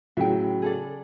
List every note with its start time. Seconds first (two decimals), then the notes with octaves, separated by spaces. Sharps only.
0.17 A2 C#3 F#3 E5 G5
0.62 G#4 A4 D5